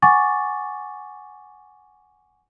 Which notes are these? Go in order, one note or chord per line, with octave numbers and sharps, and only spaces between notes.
F#5 G#5 C#6 D6 A6